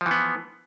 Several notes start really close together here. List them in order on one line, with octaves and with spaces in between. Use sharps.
F3 E3 B3